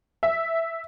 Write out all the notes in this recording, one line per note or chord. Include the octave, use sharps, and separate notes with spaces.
E5